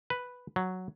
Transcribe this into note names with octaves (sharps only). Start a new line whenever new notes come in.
B4
F#3